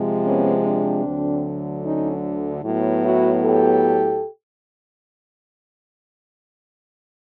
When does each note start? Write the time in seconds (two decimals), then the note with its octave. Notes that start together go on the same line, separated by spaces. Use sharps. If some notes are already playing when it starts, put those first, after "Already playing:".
Already playing: C3 F3 G#3
0.26 B3 C#4
0.65 C4 D4
1.05 D2 D3 F#3
1.85 C#4 D#4
2.64 A2 F#3 B3
3.03 E4 F#4
3.43 G4 A4